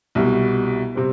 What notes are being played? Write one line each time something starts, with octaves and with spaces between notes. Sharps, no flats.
C2 B2 G3
C3 G3 C4